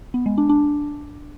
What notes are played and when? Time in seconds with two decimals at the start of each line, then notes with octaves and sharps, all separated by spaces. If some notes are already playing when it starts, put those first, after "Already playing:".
0.14 B3
0.26 G#3
0.38 D4
0.49 D4